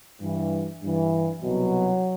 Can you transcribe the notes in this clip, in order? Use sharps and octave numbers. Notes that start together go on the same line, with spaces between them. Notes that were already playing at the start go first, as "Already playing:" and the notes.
G2 E3
G2 E3
C2 B2 F#3